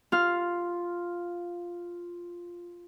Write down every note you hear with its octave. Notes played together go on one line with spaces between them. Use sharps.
F4 F6